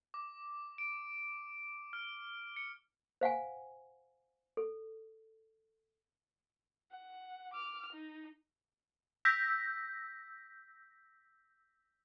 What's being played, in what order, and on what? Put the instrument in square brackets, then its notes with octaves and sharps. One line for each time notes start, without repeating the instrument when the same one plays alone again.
[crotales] D6
D7
F6
C#7
[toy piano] C5 F5 F#5 G#5
A4
[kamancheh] F#5
D6 F6
D#4
[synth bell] E6 G6 A#6 B6